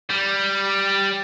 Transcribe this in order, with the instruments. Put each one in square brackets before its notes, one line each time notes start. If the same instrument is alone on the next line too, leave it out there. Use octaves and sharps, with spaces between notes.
[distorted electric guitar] G3